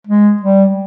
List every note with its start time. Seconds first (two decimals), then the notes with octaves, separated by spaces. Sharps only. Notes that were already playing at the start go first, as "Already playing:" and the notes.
0.07 G#3
0.41 G3